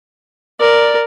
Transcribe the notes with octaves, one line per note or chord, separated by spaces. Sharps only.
A#4 D5